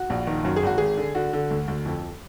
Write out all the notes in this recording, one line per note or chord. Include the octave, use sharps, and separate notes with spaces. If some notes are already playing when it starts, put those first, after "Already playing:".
Already playing: F#4
A#1
D#3
F#2
G#4
G#1 F#4
G#1 G#4
D3
D3 F#4
D3
D2
D2
F2